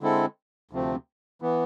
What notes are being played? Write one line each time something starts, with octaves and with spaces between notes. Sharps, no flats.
D3 G#3 C4 E4 A4
D2 C3 F3 A3 C4
E3 B3